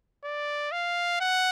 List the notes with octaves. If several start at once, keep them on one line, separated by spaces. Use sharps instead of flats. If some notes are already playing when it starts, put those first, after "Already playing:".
D5
F5
F#5